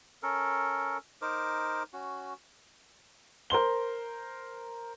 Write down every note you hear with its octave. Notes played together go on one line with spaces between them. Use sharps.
C#4 A4 A#4
D#4 A#4 C5 D6
C#4 F#4
A#4 C5 C6 G7